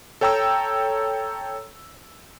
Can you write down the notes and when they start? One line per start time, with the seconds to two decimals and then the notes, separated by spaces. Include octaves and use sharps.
0.21 A4 C#5 G5 A#5 E6